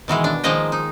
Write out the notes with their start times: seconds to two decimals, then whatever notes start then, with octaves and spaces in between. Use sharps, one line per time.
0.08 B2 D#3 E3 G#3
0.24 D4
0.44 D#3 F3 G#3 A#3 D#5 G5
0.72 D#4